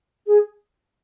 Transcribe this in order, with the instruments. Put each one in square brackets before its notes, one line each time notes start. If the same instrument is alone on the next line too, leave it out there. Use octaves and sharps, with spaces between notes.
[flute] G#4